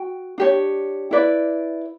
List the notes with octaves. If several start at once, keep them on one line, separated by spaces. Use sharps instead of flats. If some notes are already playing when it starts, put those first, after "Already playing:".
Already playing: F#4 G5
D4 G4 C#5
E4 B4 D5